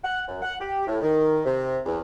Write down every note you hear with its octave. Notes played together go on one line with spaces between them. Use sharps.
F#5
F#2
F#5
G4
A2
D#3
C3
E2